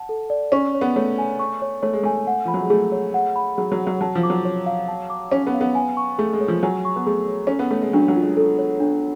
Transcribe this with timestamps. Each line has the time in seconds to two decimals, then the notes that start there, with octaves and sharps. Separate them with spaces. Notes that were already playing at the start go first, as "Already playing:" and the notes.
Already playing: F#5 A5
0.09 A4
0.30 D5
0.52 C#4 C#6
0.75 C#5
0.81 B3
0.96 A3 C#5
1.18 G#5
1.39 C#6
1.62 C#5
1.83 A3 C#5
1.93 G#3
2.03 A3 G#5
2.27 F#5
2.45 F3 B5
2.54 F#3
2.62 G#3
2.70 A3 G#4
2.92 C#5
3.14 F#5
3.36 B5
3.57 F#3 G#4
3.72 F#3
3.79 C#5
3.87 F#3
4.01 F#3 A5
4.15 F3
4.23 D6
4.30 F#3
4.45 C#5
4.66 F5
4.88 A5
5.10 D6
5.32 C#4 C#5
5.47 B3
5.54 F5
5.61 B3
5.75 G#5
5.97 C#6
6.18 A3 G#4
6.33 G#3
6.41 C#5
6.48 F3
6.63 F#3 G#5
6.85 C#6
6.96 B3
7.06 A3 G#4
7.28 C#5
7.47 C#4 A4
7.59 B3
7.71 A3 C#5
7.81 G#3
7.93 F#3 D4
8.08 F#3
8.15 F4
8.22 G#3
8.37 A4
8.58 C#5
8.80 D4